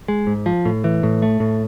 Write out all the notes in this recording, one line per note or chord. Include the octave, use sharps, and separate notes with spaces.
G#3
G#2
F3
A2
E3
A2
A3
A2